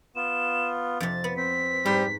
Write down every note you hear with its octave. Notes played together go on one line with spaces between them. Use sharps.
B3 F4 E7
F2 C3 A6
B3
C4 B6
G#2 G3